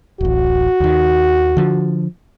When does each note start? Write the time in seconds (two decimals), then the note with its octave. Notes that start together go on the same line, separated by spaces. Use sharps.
0.21 D1 A1 F#4
0.80 D#2 D#3
1.57 D3 F3